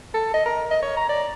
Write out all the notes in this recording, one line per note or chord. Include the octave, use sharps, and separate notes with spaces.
A4
D#5
A#4
D#5
C#5
A#5
D5